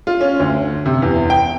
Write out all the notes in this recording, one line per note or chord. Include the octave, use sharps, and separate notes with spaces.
F4
C#4
D2
C3
E2
G5